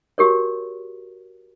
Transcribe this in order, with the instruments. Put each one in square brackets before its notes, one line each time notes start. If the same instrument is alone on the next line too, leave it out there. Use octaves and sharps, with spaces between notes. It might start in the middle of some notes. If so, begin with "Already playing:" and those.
[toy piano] F#4 G4 A#4 C#5